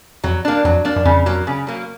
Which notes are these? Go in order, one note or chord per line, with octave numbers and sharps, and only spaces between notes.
F2 F#3
A#3 D4
F2 F#3
A#3 D4
F#2
F2 C#3
F#3 A#3
C#3
F#3 A#3